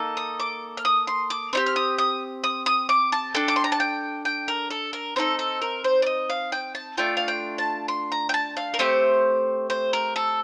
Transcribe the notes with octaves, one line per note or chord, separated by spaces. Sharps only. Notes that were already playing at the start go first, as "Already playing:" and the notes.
Already playing: A#3 D#4 A4
D#6
D6
F6
D#6
C6
D6
C4 D#4 G4
F6
D#6
D#6
D#6
D#6
D6
A5
D4 A4 G5
D6
C6
A#5
A5
G5
G5
A#4
A4
A#4
C4 D#4 A4 C5
A4
A#4
C5
D5
D#5
F5
G5
A5
A3 D4 F4 G5
F5
G5
A5
C6
A#5
G5
A5
F5
A#4
A3 C4 G4 C5
C5
A#4
A4